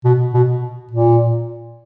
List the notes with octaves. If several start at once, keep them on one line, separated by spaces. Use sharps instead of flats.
B2
B2
A#2